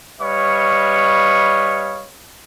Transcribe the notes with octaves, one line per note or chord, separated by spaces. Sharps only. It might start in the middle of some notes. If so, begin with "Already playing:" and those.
G3 B4 C#5 D#5 F5 C#6